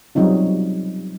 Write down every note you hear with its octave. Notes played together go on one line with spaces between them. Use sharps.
F#3 G3 C4 D#4 F4